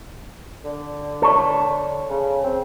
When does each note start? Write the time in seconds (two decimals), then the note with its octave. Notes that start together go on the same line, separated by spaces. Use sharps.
0.64 D3
1.22 A4 C#5
2.10 C#3
2.43 C4